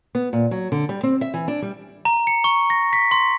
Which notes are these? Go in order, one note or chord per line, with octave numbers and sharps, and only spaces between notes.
B3
A#2
F#3
D3
G3
C4
E5
E3
D4
G3
A#5
C#7
C#6
A#6
B6
C6